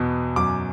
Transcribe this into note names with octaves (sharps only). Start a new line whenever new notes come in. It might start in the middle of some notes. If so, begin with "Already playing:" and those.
Already playing: E2 B2
F#2 D6